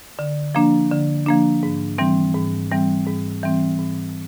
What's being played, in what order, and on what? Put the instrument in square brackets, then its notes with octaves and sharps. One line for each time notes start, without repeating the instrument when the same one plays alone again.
[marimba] D3
F3 A#3 D4
D3
F3 A#3 D4
G#2
E3 G3 C4
G#2
E3 G3 C4
G#2
E3 G3 C4
G#2